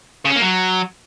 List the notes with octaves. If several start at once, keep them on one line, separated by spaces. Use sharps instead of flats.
C#3
C#4
A#3
F#3